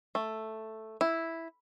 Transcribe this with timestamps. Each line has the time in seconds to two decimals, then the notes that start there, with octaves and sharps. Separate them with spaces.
0.15 A3
1.01 E4